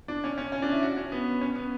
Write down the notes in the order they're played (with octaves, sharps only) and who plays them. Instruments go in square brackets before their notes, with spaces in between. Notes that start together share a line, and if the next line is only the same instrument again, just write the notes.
[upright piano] D4
C#4
C#4
C#4
D4
E4
F#4
C#4
B3
C#4
B3